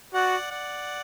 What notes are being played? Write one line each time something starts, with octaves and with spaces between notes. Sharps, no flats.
F#4 D5 F#5
D5 F#5